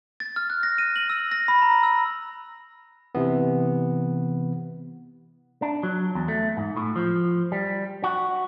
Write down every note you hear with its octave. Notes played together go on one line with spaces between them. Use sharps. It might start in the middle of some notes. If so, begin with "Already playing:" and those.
A6
F6
F#6
A#6
D#7
F#7
E6
A#6
B5
A#5
E6
C3 E3 B3
D4
F#3
E2
A3
G#2
A2
F3
G3
F#4